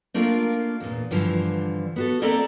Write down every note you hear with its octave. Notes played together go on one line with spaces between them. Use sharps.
A3 A#3 D4 F4 A#4 F5
E2 A#2
G2 D3 E3 F3
B3 F#4 A4
A#3 C4 A4 D5 E5 A#5